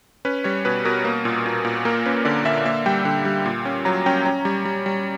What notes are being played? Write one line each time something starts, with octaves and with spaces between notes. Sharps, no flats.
C#4 B4
G3 C#5
B2 B4
B2 A#4
A#3
A#2
A#2
A#2
A#3 A#4
C#4 B4
D3 D5
D3 E5
A#3 E5
G3 G5
D3
G3
A#2
C#4
F#3 A#5
C#4 G5
C#4 A#5
G3
G3
G3